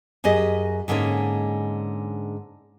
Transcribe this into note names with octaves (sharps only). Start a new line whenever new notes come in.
F#2 G4 G#4 D#5
G#2 D3 G#3 A#3 C#4